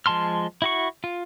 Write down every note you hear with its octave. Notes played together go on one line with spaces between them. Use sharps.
F3 G#3 A5 C6 F6
E4 F#4 C#6
F4